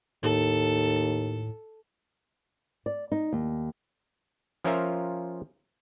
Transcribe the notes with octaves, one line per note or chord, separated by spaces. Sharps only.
D#2 A2 A4
D5
D#4
D#2
F3 C#4 F4 A#4 E5 A#5